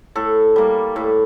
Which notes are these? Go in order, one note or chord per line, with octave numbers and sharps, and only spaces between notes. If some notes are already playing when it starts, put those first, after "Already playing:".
A2 A4
G3 A#3
A2